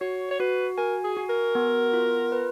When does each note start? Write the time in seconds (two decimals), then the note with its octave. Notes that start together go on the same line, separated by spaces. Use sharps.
0.01 F#4 C#5
0.31 C#5
0.40 F#4 B4
0.78 A#4 G#5
1.04 G#4
1.17 F#4
1.29 A#4
1.55 B3
1.94 F4
2.32 B4